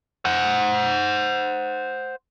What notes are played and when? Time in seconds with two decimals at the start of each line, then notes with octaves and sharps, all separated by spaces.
0.25 C5 F#5